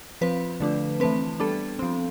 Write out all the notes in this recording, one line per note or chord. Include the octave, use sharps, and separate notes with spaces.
F3 C4 B4
D3 F3 A3 D4
E3 A3 C4 B4
G3 B3 D4 A4
F3 C4